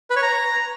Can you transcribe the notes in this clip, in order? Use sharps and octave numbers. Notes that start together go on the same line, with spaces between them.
B4
C#5
A#5